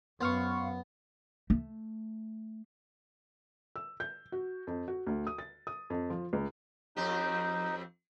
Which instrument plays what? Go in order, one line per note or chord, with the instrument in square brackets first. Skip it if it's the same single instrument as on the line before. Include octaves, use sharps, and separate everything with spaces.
[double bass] F#2 [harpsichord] B3 [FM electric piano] C5 F5 C#6
[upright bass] A3
[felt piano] E6
G6
F#4
F2
F#4
D2
D#6
A6
D#6
F2
F3
C#2
[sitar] F2 C4 G4 [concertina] D#4